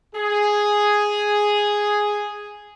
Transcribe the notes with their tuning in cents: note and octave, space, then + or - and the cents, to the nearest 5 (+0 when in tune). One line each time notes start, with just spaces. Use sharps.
G#4 +0